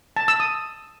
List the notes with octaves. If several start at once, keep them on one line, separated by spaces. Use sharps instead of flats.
A5
E6
D#6